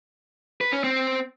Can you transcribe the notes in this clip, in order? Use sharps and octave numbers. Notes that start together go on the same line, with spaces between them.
B4
C#4
C4